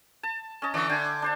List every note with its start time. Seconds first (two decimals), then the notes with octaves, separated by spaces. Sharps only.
0.23 A5
0.62 C#4 D#5 A5
0.74 D3 E3 D5 C#6
0.90 D3 G5 G#5 D6
1.22 D4 C5 A5